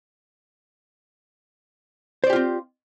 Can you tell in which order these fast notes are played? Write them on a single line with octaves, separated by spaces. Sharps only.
C5 D5 G4 F4 C4